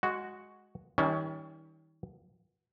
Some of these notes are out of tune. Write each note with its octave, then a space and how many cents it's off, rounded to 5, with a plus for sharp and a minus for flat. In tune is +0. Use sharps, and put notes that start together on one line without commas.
G#3 +0 F#4 +0
D#3 +45 G3 +0 C#4 +25